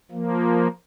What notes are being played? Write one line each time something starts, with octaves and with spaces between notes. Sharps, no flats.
F3 A#3